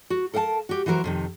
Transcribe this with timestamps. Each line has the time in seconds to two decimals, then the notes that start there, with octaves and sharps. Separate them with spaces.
0.10 F#4
0.34 A4 A#4 F5 F#5 A5
0.69 F#4 G4
0.86 E3 F#3 F#4 A#4 C5
1.04 F2 C3 D#3